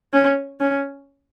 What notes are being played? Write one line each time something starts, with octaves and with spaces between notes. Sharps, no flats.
C#4
C#4